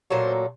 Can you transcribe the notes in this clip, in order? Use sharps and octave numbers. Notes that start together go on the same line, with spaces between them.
A#2 F#3 A3 C5